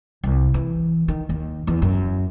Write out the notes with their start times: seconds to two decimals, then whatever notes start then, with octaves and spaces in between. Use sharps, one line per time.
0.24 C2
0.54 E3
1.08 D#3
1.29 D#2
1.67 E2
1.82 F#2